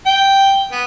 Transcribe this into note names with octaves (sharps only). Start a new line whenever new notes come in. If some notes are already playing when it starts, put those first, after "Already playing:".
G5
B3